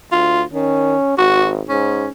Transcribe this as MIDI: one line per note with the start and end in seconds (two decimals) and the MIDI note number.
0.12 0.44 38
0.12 0.42 65
0.53 0.96 51
0.53 1.17 61
1.18 1.62 32
1.18 1.49 66
1.69 2.07 44
1.69 2.09 61